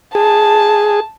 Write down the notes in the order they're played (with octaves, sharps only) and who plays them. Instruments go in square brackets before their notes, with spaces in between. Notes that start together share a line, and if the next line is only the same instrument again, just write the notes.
[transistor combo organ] G#4 [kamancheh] A5